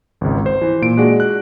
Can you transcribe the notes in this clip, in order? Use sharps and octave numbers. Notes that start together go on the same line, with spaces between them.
G#1 C#2
C5
E3
A#2 D7
G#3 D4 F#4
F#6